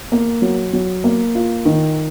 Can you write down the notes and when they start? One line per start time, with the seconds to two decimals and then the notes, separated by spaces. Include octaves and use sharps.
0.12 A#3
0.42 F#3
0.73 F#3
1.04 A#3
1.35 F4
1.65 D#3